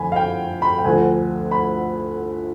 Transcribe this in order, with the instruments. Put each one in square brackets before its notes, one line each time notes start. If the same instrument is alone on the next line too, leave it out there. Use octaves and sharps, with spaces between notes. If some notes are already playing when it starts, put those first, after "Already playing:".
Already playing: [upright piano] F2 D3 G#5 B5
F5
G5
B5
G5
D2 D3 F3 G#5
B5